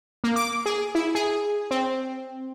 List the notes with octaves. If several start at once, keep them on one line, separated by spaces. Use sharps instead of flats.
A#3
D6
G#4
E4
G#4
C4